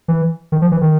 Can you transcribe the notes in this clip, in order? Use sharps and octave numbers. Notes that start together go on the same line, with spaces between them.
E3
D#3
F3
E3
D#3